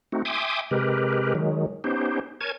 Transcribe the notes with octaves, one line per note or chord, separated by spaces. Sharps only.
A3 C4 D#4 F#4
E5 G5 G#5 C6 D6 D#6
C3 G#3 G4 A#4 B4
D#3 F#3 G#3
B3 C#4 D#4 G4 C5
A#4 C#5 G#5 A5 G#6